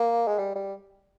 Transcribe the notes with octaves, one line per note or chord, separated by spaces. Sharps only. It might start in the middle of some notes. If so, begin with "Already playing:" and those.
Already playing: A#3
G#3
G3
G3